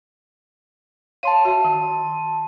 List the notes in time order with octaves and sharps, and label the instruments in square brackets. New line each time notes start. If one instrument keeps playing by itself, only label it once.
[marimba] C#5 F5 [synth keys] A5 C6 D#7
[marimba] F#4 E5
D#3